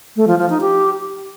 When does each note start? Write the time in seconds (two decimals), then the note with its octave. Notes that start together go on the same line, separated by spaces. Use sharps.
0.16 A3
0.28 F3
0.39 F3
0.50 D#4
0.61 G4